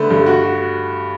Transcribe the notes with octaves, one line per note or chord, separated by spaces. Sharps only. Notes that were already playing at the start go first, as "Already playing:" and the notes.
Already playing: D3 A3 B3
G2
F#4
F#4